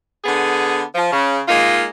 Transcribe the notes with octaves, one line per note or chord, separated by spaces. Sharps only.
D3 B3 G#4
F3
C#3
G#3 A#3 D#4 F4